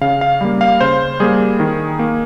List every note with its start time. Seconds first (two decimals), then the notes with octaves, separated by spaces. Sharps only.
0.01 C#3 F5
0.21 F5
0.41 G3 A#3
0.61 F5
0.81 C#3 C5
1.20 G3 A#3 G#4
1.60 D#3
1.99 A#3